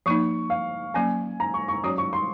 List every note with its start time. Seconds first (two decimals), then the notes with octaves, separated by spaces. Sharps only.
0.06 F3 A#3 D#4 C#6
0.50 F5
0.94 F#3 A#3 C#4 G#5
1.40 A#5
1.54 C#6
1.68 C#6
1.84 F#3 C#4 F#4 C#5 D#6
1.98 C#6
2.13 C6